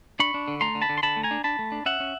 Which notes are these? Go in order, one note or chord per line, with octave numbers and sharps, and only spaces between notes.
D4 B5 C#6
D4
D3
A3 A#5 C6
D3
A5 B5
D3
C6
D3 A5 B5
A3
G#5 A#5
D4
D4 A5 B5
A3
D4
C#4 E5 F#5
C#4